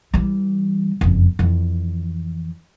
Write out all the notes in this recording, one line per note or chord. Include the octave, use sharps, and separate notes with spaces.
E3 G3
F#1 F2
F2 E3